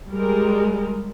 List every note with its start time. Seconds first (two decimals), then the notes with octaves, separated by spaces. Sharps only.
0.11 G3 G#3 A#4